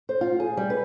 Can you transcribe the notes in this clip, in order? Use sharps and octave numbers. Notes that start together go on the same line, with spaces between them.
C5
F4
G#4
G3
B4